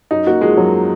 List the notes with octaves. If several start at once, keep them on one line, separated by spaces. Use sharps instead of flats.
F#2 D#4
A#3 F#4
F3 G#3
F#2 F#3